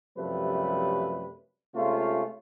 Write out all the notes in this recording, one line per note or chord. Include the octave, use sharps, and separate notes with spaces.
F#2 C3 F3 G3 A3 B4
C3 G#3 A3 C#4 F4